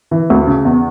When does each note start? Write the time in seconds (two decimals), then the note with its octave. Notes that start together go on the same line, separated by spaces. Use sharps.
0.11 E3
0.30 D2
0.47 C#3
0.65 E2